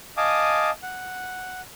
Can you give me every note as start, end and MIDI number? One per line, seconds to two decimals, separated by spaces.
0.17 0.70 75
0.17 0.70 77
0.17 0.70 80
0.17 0.70 81
0.17 0.70 86
0.17 0.70 87
0.83 1.61 78